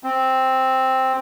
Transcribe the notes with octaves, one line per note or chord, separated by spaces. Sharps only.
C4